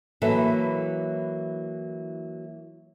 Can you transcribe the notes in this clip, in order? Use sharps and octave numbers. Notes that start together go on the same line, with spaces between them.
E3 F#3 A#3 E4 A4 B4